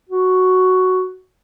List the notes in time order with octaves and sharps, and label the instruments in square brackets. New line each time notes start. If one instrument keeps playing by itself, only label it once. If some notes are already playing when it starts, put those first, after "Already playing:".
[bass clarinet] F#4